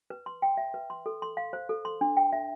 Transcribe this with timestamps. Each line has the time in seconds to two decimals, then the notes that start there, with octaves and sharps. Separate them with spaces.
0.10 B4
0.26 C6
0.42 G5
0.57 E5
0.74 B4
0.90 C6
1.06 A4
1.22 C6
1.37 F5
1.53 C5
1.69 A4
1.85 C6
2.01 D4
2.17 G5
2.33 E5